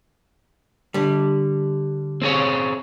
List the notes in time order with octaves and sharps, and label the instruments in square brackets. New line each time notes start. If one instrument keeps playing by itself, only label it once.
[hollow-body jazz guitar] D3 G3
[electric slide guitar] C4 G#4 C#5